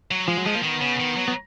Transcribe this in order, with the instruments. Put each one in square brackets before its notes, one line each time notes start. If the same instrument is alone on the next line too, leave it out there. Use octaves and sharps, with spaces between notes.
[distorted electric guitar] F#3
[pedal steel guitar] F3 [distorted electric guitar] G#3
[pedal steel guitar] F#3
[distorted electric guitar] F3 [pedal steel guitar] G#3
[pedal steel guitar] A#3
[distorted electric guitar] D#3 [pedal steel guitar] B3
[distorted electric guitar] C#3
D#3
F#3
[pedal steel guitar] B3